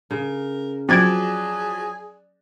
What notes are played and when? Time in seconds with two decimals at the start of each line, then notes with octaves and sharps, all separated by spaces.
0.11 C#3 A#4
0.89 F3 F#3 C4 G#4 D5 G#6 D7